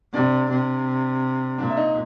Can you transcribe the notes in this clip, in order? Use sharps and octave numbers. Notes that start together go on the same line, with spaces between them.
C3 D4 D5
C3
A#2 D4 D5
E5
D#4 D#5